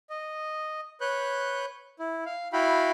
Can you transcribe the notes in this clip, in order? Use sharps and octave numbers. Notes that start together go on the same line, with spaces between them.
D#5
B4 C#5 F#6 G6
E4
F5
E4 F#4 F5 G5 B5